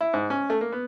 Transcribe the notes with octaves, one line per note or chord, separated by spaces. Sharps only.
E4
G#2
C#4
A3
A#3
B3